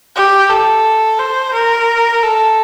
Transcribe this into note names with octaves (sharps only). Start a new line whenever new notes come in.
G4
A4
C5
A#4
A4